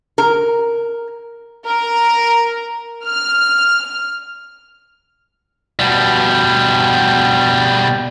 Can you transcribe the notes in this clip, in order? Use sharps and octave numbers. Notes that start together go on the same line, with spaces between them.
A#4
A#4
F6
B2 G3